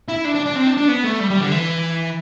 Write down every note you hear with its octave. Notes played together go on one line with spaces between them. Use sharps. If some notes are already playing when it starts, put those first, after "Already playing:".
E4
D4
D4
D4
C4
D4
D4
B3
A3
G3
G3
D3
E3